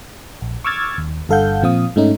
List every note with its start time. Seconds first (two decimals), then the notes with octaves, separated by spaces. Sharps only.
0.42 A#1
0.64 C#6 D6 E6 F6 G#6 A6
0.98 D#2
1.29 G1 G2 A4 F5 F#5 G6
1.62 A#2 F3 C4 F5 D#6
1.96 G#2 A3 C#4 D#4